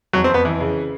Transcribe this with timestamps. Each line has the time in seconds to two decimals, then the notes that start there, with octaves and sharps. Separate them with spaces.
0.13 F2 F#3
0.24 C4
0.29 F2 B3
0.45 E3
0.60 C#3